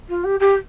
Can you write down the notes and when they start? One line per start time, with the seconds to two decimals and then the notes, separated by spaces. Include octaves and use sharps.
0.09 F4
0.24 G4
0.40 G4